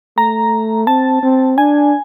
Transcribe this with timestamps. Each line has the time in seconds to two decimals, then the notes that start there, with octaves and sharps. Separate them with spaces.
0.17 A3 A#5
0.87 C4 A5
1.23 C4
1.57 D4 G#5